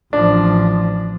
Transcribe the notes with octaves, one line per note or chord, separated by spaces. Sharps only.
A1 F3 D4